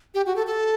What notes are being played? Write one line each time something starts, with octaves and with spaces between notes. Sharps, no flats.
G4
F#4
A4
A4